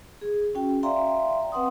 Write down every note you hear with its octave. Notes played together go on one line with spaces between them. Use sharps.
G#4
C#4 F#4 G5
D5 E5 F5 G5 A#5 C6
C4 B4 F#5 C6 D#6